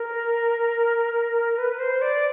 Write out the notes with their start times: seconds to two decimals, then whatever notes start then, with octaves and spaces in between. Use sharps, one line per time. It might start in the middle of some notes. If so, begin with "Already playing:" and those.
Already playing: A#4
1.58 B4
1.79 C5
2.02 D5